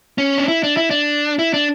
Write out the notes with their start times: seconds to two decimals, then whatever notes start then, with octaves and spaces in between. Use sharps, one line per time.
0.18 C#4
0.38 D4
0.48 E4
0.63 D4
0.77 E4
0.90 D4
1.39 E4
1.54 D4